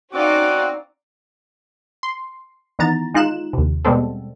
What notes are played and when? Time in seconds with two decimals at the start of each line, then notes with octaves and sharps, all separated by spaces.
0.13 C4 C#4 D#4 F#4 D5 F5
2.03 C6
2.79 D#3 E3 B3 A#5 A6
3.14 G#3 D#4 F4 F#6 E7
3.53 D#2 C3
3.85 B2 G3 G#3 B3 C4 A4